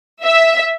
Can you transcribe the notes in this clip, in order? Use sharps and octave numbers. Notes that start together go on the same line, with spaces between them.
E5